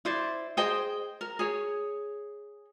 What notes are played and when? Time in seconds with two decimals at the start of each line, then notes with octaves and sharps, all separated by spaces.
0.05 E4 C5 D5
0.57 G#4 C5 D#5 G5
1.21 A#4
1.39 G#4 C#5